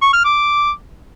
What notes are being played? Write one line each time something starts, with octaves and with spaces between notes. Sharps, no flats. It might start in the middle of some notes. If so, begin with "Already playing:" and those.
C#6
F6
D6